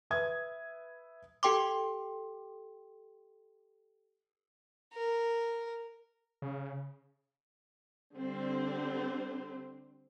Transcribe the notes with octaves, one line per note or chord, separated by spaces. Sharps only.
B4 E5 D#6 G#6
G4 A4 G5 C6 D6
A#4
C#3
D3 G3 C4 C5